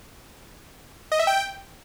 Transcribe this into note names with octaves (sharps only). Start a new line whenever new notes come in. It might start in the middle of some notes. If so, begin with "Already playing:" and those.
D#5
E5
G5